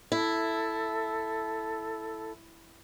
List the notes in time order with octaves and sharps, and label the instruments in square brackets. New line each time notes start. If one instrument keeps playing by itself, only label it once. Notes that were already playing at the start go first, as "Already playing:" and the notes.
[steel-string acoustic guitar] E4 [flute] A4